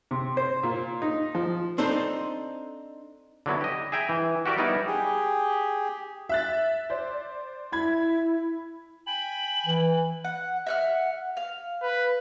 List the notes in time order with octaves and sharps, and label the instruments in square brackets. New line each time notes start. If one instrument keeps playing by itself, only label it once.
[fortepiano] C3
C5
A#2
D#4
F3
[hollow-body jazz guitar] C4 D4 D#4 A4 C5
[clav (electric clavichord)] D3 F#3 B3 E4
G4 D#5
G#4 E5 G5 G#5 A#5
E3
F#4 G4 A#4 D5 E5
G3 B3 D#4 E4 A#4 D5
[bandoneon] G4 G#4
[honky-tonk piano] E5 F#6 A6
C5 D5
[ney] E4 [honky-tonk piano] B5 G#6
[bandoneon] G5 G#5 B5 [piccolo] F#7
[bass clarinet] E3
[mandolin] F#5
E5 F#5 F6
F5
[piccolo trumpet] B4